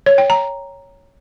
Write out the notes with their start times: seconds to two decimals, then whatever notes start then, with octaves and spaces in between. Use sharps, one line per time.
0.06 C#5
0.18 G5
0.30 A#5